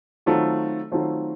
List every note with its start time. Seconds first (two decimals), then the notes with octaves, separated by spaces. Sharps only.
0.26 D#3 F#3 A3 C4 F4
0.91 D#3 F#3 A3 C4 F4